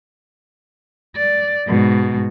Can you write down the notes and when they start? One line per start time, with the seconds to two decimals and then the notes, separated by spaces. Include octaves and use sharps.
1.16 D5
1.67 G#2 B2